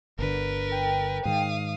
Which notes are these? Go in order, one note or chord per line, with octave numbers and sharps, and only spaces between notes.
G1 D3 A#4 B4
G5
G#2 D#3 F5 D#6